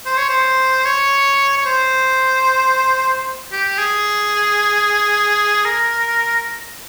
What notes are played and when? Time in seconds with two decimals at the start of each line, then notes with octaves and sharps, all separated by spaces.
0.06 C5
0.18 C#5
0.29 C5
0.86 C#5
1.58 C#5
1.66 C5
3.52 G4
3.78 G#4
5.65 A#4